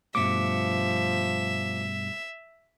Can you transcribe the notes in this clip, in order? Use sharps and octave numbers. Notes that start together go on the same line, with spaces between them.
G2 B2 F3 A3 E5 D6